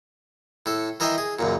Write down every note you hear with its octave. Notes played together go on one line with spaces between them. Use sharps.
A2 A4
E3 A#4 D#5 E5 G5 C6
G#4
C#2 F#2 A#2